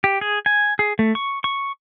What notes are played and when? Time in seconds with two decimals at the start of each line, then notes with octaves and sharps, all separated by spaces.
0.04 G4
0.21 G#4
0.46 G#5
0.79 G#4
0.99 A3
1.15 C#6
1.44 C#6